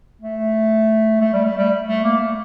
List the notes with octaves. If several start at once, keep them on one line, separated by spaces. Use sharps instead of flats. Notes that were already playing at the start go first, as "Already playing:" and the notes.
A3
A3
G3
A3
G3
A3
A#3
A3